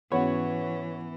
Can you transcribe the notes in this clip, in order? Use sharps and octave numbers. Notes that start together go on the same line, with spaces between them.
G#2 E3 B3 C#4 F#4 C#5 F#5